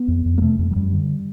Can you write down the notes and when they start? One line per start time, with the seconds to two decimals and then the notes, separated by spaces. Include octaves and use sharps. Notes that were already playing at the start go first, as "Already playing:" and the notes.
Already playing: B3
0.08 F2
0.26 F2
0.38 A#3
0.42 C3 A3
0.59 F2 A3
0.71 F#3
0.76 F#2 G3
0.93 D3